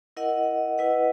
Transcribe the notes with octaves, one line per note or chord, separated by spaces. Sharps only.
E4 A#4 D#5 F#5
E4 B4 D#5 F#5